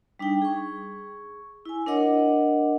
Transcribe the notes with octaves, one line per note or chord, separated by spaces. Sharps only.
G3 D4 D#4 G5
G#4 C#6
E4 G#5
D4 A#4 C#5 D#5 F#5 D6